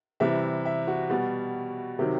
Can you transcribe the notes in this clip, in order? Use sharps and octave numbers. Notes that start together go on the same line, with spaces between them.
C3 E3 G3 E5
E5
F#4
B2 G3
C3 D#3 F#3 G4